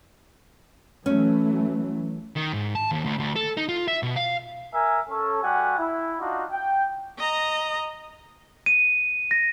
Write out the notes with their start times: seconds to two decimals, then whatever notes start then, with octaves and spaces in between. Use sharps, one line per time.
1.06 E3 F#3 A3 C#4
2.36 D#3
2.53 G#2
2.75 A5
2.92 D#2
3.05 D2
3.19 D2
3.36 A4
3.57 D#4
3.69 F4
3.88 E5
4.03 B2
4.16 F5
4.73 A#4 E5 G#5
5.09 C#4 A4
5.43 G3 F#4 F#5 G#5
5.79 E4
6.20 D4 D#4 F4 F#4
6.51 G5
7.18 D#5 A#5
8.66 D#7
9.31 A#6